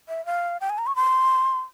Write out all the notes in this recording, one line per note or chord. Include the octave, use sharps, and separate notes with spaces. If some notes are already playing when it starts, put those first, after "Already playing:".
E5
F5
G5
G#5
A#5
C#6
C6